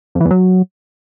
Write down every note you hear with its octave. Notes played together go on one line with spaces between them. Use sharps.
F2
E3
E2
F#3